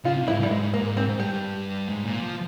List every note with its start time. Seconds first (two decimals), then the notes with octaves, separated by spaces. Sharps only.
0.05 C#3 F4
0.17 C3
0.27 G#2 E4
0.40 G2 G3
0.51 G#2 G#3
0.74 G#2 A#3
0.97 G#2 C4
1.09 G#2
1.20 G2 G4
1.89 G#2
2.04 A#2
2.20 F3